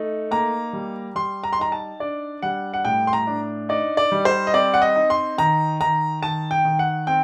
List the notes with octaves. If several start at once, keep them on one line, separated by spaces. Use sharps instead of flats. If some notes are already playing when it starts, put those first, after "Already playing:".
Already playing: A3 D#4
A#3 A#5
G3
G3 C6
A#5
C6
D#4 A#5
A5
D4 D5
G3 F#5
F#5
A2 G5
C6
A#5
D4
D#4 D5
D5
G3
C5
D#5
C4 D5
F#5
D#5
D#4
C6
D#3 A#5
D#3 A#5
D#3 A5
G5
D#3
F#5
C4 G5